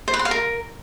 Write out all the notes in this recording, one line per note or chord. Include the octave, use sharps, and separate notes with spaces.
C5
B4
C6
F5
A#4